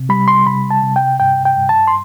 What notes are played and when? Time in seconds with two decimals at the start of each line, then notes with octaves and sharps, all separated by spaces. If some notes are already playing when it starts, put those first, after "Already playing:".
Already playing: C3
0.09 G3 B5
0.28 C6
0.46 C3 B5
0.71 A5
0.83 C3
0.96 G5
1.20 G2 G5
1.45 G5
1.57 G2
1.69 A5
1.87 C6